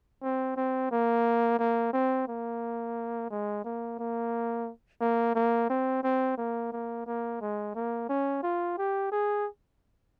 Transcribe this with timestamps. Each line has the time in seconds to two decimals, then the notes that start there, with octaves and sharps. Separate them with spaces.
0.22 C4
0.57 C4
0.91 A#3
1.59 A#3
1.93 C4
2.28 A#3
3.31 G#3
3.65 A#3
3.99 A#3
5.01 A#3
5.35 A#3
5.70 C4
6.04 C4
6.38 A#3
6.72 A#3
7.06 A#3
7.41 G#3
7.75 A#3
8.09 C#4
8.43 F4
8.78 G4
9.12 G#4